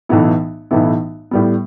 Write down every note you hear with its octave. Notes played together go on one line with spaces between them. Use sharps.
B1 A2 E3 B3 E4
B1 A2 E3 B3 E4
A2 G3 B3